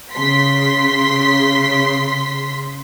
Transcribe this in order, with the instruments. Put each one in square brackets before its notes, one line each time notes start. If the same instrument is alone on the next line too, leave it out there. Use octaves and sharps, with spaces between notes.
[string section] C#3 C6 B6